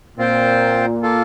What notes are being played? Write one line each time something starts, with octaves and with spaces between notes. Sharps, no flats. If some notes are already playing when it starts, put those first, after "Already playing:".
A#2 C4 F4 C5 G5
A#3 F4 A4